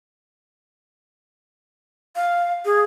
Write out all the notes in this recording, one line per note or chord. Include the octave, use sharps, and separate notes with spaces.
F5
G#4